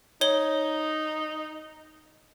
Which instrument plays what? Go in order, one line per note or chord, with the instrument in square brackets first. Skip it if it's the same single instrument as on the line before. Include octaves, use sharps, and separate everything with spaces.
[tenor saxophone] D#4 [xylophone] C#5 G7